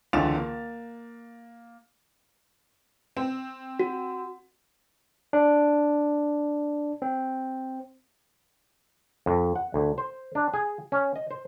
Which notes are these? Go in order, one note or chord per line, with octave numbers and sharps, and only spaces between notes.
C#2 D3 E3 A6 E7 F7
A#3
C4
F#4
D4
C4
F2
F#5
D2
C5
D4
G#4
C#4
D#5
C5